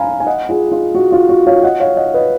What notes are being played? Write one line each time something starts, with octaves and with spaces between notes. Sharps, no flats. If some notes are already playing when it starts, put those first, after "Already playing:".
Already playing: F5 G#5 A#5 B5
G#5
D#5 F#5
F4 G#4
F4
F#4
F4
F#4
C#5 F5
D#5 F#5
C#5 F5
D#5 F#5
B4 D#5